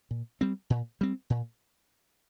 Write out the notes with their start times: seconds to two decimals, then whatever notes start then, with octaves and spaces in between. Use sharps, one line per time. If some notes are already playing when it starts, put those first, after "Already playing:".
0.11 A#2
0.41 G3 C4
0.70 A#2
1.01 G3 C4
1.30 A#2